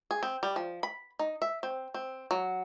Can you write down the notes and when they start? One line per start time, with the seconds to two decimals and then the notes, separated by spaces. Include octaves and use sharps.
0.11 G#4
0.23 C4
0.43 G3
0.56 F3
0.83 B5
1.19 D#4
1.42 E5
1.63 C4
1.94 C4
2.31 F#3